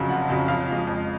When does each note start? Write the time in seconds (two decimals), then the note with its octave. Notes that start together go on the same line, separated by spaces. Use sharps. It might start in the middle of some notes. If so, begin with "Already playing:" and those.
Already playing: F2 C#3 F#3
0.09 F1 F#5
0.28 F2 C#3 F#3
0.48 F2 F5
0.68 F3 G#3
0.87 F2